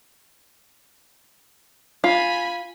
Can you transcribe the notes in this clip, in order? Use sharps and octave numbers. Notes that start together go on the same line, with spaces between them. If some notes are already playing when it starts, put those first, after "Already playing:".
F4 G#5 B5